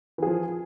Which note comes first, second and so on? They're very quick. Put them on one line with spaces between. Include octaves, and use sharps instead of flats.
E3 G#4 F3